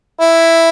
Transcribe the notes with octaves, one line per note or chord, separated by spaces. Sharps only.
E4